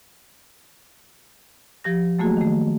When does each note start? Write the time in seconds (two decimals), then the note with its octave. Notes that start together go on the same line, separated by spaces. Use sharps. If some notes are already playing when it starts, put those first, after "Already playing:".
1.84 F3 G4 A#6
2.19 F#3 A3 A#3 F#4 G#4
2.37 D#3 A3